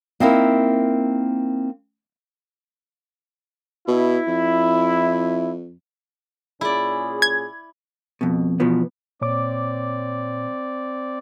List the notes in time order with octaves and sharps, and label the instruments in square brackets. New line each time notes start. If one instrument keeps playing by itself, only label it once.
[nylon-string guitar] A#3 C4 D#4 E4 A#4
[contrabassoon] B2 [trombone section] E4
[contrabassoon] F2
[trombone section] A#2 C#4 G#4 [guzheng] E4 D5
[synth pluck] G#6
[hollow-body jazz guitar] F2 B2
B2 E3 F3 B3
[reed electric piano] A#2 C#5 D6 [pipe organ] C4 D5